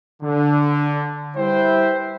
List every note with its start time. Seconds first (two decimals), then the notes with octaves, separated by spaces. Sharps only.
0.22 D3
1.36 G3 E4 B4 C5 E5 G5